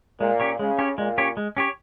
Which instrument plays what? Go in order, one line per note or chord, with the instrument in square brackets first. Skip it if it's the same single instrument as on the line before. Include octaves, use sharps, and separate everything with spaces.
[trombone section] A#2 [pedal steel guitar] G#3
[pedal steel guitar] C#4 G4 C#5
[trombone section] C#3 [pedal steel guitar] G#3
[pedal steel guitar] C#4 G4 C#5
[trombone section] A#2 [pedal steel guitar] G#3
[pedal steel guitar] C#4 G4 C#5
G#3
C#4 G4 C#5